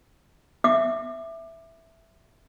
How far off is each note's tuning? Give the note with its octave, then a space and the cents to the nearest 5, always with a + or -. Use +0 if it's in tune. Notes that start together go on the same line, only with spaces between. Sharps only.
E5 +0 D6 +25